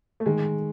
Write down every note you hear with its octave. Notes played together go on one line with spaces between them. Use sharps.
A3
D#3 G#3